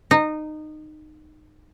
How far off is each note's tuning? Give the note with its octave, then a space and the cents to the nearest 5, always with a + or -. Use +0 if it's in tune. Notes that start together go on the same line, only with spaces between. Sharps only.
D#4 -20